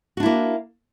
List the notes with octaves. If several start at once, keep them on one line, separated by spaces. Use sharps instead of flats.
A#3 D4 E4 F#4